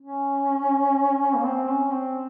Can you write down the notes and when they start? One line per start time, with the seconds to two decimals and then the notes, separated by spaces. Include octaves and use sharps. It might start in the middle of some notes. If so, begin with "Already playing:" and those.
0.01 C#4
1.36 A#3
1.45 C4
1.69 C#4
1.92 C4